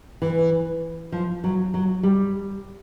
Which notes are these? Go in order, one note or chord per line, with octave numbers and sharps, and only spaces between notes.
E3
F3
F#3
F#3
G3